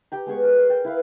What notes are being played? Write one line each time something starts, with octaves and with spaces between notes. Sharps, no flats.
G4 G5 A#5
G#3 B3 G#4 C#6
A#4
C6
G5
E4 B4 F5